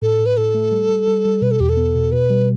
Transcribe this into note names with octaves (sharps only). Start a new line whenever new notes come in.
A2 A4
A2
B4
A2 A4
A3
G3
G3
G3
G3
B2 B4
A4
E2 G4
A4
B3
B2
B2 B4
G3